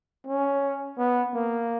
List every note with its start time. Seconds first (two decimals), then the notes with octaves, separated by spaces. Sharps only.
0.27 C#4
0.98 B3
1.34 A#3